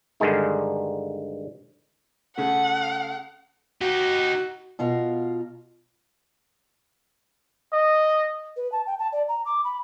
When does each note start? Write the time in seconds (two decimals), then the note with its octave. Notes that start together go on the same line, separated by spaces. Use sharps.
0.20 G2 D3 D#3 G#3 D#4
2.38 C#3 A3 F#5
3.81 D#4 F#4 G4
4.79 B2 F4 A#4 F5
7.73 D#5
8.57 B4
8.72 A5
8.87 G5
8.99 A5
9.13 D5
9.28 A#5
9.45 D6
9.64 B5